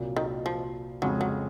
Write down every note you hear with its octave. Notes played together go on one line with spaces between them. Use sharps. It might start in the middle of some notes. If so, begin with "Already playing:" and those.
Already playing: C2 A#2 F#3 A#3
D#3
F3
F2 C#3 F#3 G#3 C#4
F#3